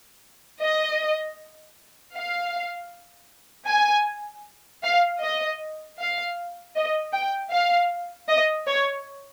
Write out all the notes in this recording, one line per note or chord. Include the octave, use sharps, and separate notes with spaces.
D#5
F5
G#5
F5
D#5
F5
D#5
G5
F5
D#5
C#5